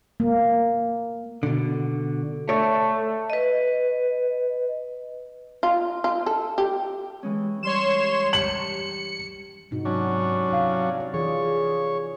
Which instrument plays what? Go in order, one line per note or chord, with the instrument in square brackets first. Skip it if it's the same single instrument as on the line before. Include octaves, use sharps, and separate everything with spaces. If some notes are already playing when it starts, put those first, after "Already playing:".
[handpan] A#3
[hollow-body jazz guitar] B2 D3
[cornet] A3 [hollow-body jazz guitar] C#5 D5 E5
[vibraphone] B4 D#5
[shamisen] F4
F4
A4
G4
[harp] E3 G#3 C#4
[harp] G3 [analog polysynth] C#5 C6 E7
[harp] G4 [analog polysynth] C#7 [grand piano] F#7
[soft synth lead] G#2 [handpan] C3 D#4 F#4
[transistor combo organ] F#3 C#4 D4
[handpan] C3 E4 [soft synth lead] F5
[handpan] D5
[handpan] E3 F4 [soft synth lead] G#4 [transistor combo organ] C#5